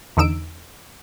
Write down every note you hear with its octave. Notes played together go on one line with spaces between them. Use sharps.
E2 D3 D#4 E6 D7